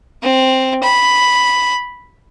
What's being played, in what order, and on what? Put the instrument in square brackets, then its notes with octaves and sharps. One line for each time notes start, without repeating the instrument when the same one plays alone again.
[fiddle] C4
B5